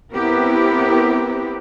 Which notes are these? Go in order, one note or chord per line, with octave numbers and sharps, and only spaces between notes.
B3 C4 E4 G4 A#4 B4